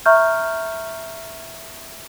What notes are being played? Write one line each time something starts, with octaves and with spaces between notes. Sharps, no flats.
E5 A#5 C#6 F6 G6